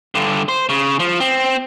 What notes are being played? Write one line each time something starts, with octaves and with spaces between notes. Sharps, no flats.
G2 D3
C5
C#3
F3
C4